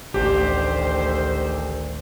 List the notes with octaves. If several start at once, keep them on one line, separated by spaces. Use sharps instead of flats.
A1 D2 D#3 G4 C5